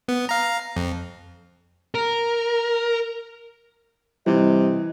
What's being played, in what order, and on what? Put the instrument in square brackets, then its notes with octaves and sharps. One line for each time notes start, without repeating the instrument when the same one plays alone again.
[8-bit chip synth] B3
F5 A#5
F2
[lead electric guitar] A#4
[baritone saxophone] C3 [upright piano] E3 [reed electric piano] G3 [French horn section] D#5